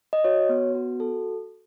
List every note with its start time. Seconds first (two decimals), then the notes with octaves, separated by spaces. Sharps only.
0.13 D#5
0.24 F#4 C#5
0.49 B3
0.75 F#4
1.00 A4